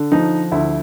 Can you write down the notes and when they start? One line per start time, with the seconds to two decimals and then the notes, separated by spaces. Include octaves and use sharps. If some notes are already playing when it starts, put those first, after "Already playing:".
Already playing: D3
0.12 F3 D#4
0.52 D2 E4